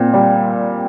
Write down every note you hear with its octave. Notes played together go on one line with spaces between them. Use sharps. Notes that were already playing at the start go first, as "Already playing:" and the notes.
Already playing: A#2 C4
G3